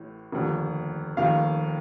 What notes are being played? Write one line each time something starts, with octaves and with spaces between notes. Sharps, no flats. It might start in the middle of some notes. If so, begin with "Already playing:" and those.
Already playing: A1 A2
F1 D#2 D3
F1 D#2 D#3 F5